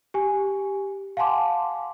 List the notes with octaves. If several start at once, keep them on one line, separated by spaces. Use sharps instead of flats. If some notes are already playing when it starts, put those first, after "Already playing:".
G4 G#5
F5 F#5 G#5 A5 C6 D6